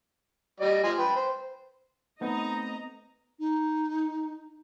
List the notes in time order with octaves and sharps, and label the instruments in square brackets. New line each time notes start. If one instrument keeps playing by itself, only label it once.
[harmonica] G3 D5 D#5
F3 G#5 C6
B4 G5
C5
[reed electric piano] A3 B3 C4 [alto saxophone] D#4 [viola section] D#5 A#5
[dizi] D#4